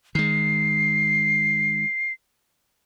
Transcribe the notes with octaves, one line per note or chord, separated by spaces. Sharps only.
D#3 G#3 C7